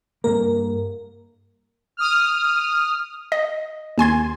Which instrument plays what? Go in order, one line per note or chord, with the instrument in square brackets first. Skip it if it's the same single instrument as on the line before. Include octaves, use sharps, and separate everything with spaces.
[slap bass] G2 A#3 [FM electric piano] A#4
[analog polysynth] D#6 F6
[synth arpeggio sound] D#5
D#2 G#5 C6 G#6